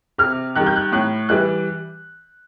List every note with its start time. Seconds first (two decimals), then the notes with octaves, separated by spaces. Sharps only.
0.18 C3 F6
0.55 D#3 G3 F#6
0.66 G6
0.76 F#6
0.92 A2 F#6
1.29 E3 G3 F#6